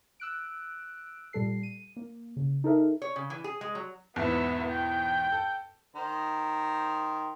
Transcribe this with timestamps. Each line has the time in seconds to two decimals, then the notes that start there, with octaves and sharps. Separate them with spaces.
0.20 E6 F#6 D7
1.33 A#2 G3 A4 C7
1.63 D#7
1.96 A#3
2.36 C#3
2.64 D#4 A4 A#4 E5
3.02 C#5
3.16 C#3
3.30 E3
3.44 G#4
3.61 G#3
3.75 F#3
4.16 E2 G#2 B2 B3 E5
4.69 G5
5.32 A4
5.96 D#3 C5 A#5